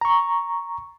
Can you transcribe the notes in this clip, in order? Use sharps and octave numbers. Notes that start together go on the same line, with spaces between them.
A#5 C#6